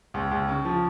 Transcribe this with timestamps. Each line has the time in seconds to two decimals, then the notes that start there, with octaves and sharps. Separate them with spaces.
0.14 C#2
0.31 C#2
0.48 C#3
0.65 F3